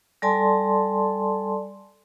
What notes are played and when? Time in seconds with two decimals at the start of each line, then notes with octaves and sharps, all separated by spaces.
0.22 G3 A4 D5 G#5 A5 C6